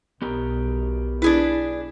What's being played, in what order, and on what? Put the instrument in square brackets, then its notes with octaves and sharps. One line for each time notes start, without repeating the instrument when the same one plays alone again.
[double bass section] B1 [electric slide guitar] B3 G4 A#4
[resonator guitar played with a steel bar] D4 G#4 B4 [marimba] E4